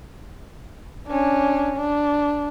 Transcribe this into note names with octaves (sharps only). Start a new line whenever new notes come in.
C#4 D4
D4